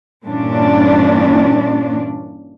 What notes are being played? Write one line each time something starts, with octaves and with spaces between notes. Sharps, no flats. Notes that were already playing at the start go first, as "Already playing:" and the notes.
G2 A#2 E3 C#4 D4